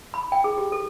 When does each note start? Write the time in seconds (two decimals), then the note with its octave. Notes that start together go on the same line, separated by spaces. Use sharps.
0.14 B5
0.32 G5
0.44 G#4
0.58 G4
0.72 A4